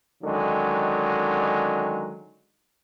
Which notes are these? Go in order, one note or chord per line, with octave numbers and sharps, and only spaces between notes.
D3 D#3 F#3 G#3 C#4